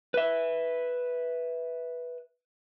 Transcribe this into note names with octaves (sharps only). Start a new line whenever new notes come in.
B4 E5